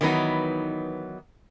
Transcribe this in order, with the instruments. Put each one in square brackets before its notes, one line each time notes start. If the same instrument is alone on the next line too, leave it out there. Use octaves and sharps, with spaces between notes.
[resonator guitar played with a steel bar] D#3 E3 F#3 B3 D#4